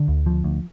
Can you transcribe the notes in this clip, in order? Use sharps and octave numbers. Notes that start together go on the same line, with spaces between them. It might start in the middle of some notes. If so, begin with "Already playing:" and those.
Already playing: D3
D2
F3
D2